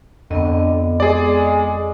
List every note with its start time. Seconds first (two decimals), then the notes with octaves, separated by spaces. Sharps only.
0.31 F2 D3 B3 D#5
1.00 G#3 G#4 D5